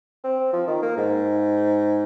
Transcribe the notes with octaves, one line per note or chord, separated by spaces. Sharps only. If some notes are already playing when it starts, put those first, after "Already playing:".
C4
F3
D#3
A#3
G#2